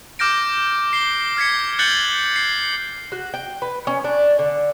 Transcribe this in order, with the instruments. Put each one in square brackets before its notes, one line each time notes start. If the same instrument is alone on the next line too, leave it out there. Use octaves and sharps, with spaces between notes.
[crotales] D6 F6 G6 A#6 D7
C7 G7
F6 G#6 B6 C#7
F#6 G6 A6 C#7 F#7 G7
C7
[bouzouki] F#4
G5
B4
C#4
D4
D3